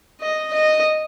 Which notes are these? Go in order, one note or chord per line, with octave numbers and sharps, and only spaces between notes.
D#5
D#5